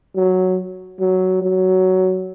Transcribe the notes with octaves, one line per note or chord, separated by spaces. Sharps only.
F#3
F#3
F#3